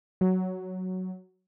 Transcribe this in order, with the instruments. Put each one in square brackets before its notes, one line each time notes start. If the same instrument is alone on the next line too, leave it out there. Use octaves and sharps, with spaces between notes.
[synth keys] F#3